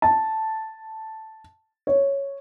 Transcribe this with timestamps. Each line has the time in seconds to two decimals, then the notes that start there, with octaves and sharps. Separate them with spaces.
0.02 A5
1.87 C#5